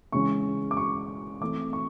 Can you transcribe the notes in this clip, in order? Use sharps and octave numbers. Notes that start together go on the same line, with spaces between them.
C#3 E3 G#3 C#4 C#6
D6
C#6
E3 A3 C4 D6
C#6